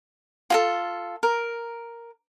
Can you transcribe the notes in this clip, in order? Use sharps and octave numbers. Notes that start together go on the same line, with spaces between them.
F4 G#4 A4
A#4